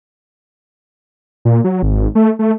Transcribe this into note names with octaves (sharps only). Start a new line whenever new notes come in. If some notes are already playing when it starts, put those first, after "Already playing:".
A#2
F#3
G#1
A3
A3